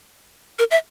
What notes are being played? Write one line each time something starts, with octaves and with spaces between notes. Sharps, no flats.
A#4
E5